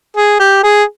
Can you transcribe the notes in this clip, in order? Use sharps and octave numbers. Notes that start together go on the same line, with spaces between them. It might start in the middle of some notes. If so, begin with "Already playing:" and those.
G#4
G4
G#4